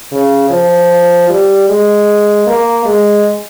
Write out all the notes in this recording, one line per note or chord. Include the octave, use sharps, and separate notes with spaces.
C#3
F3
G3
G#3
A#3
G#3